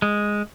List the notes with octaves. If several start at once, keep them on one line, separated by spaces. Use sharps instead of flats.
G#3